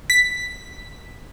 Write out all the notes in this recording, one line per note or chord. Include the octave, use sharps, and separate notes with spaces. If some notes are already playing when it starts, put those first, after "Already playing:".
B6